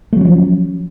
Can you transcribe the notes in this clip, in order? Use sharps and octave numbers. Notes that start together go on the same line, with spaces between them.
F3 F#3 A3 C#4